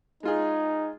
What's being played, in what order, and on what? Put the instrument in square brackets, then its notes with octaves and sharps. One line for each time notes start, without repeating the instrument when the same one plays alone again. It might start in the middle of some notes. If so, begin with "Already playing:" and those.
[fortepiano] G#3 F4 G#4 [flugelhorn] D#4